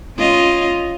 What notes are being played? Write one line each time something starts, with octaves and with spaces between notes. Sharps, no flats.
C#4 F4 D#5